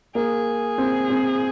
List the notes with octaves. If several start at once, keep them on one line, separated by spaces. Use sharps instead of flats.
A#3 G#4
C4
C4